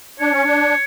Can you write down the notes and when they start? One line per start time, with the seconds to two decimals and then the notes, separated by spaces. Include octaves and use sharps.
0.20 D4 C#5
0.32 C#4
0.44 D4